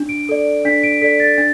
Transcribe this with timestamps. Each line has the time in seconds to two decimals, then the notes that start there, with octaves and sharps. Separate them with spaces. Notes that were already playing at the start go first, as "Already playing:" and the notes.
Already playing: D4
0.09 D7
0.29 A4 D5
0.65 D4 B6
0.83 D7
1.01 A4 D5 B6
1.20 A6
1.38 D4 A6